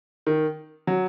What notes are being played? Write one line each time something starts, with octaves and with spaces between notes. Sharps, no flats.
D#3
F#3